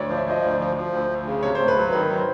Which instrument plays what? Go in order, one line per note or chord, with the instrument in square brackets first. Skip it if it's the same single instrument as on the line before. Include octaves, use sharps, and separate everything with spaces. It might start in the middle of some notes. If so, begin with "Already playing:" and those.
Already playing: [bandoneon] D2 [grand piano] C#5 D5
[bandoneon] F3
[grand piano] E5
[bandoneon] F3 [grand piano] D#5
[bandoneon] D2 [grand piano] D5
[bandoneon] F3
F3
D2
D2
C#3
[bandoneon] C3 [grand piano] C#5
[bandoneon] D2 [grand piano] C5
[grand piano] B4
[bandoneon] F#3
[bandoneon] D#3 [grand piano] B4
[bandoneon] F#3
[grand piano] C5